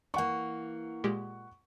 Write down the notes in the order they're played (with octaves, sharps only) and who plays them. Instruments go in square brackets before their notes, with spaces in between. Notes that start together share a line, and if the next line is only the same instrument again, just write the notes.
[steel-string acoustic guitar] E3 A#3 [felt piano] F#5 C#6
[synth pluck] A#2 G#3 G4